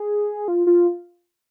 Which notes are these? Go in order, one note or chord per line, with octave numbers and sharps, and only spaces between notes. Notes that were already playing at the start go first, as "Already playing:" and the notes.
Already playing: G#4
F4
F4